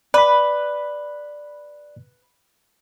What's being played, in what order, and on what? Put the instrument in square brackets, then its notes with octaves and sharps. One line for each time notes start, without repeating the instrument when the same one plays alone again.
[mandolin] B4 [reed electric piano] D5 B5